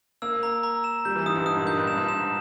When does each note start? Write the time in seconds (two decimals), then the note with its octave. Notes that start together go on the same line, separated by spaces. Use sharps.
0.22 A#3 E6
0.43 A#5
0.63 A#5
0.84 E7
1.05 G3 G6
1.16 E3
1.26 G#2 D#6
1.35 G2
1.46 G#2 D#6
1.57 A#2
1.66 G#2 G6
1.77 G2
1.87 G2 E7
1.97 G#2
2.08 G#2 E7